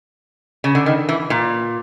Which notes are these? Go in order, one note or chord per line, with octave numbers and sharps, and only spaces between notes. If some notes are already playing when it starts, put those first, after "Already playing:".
C#3
D3
D#3
E3
A#2